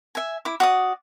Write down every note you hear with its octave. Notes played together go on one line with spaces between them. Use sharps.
E5 G#5
E4 D6
F#4 D5 D#6